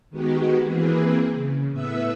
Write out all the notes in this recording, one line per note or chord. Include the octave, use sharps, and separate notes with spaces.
D#3 G#3 B3 F#4 G4
E3 A#3 C4 G#4 B4
C#3
A2 B3 B4 E5 E6